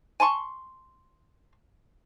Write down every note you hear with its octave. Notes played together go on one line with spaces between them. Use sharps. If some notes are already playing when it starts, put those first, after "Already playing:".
G#5 A5 C6 C#6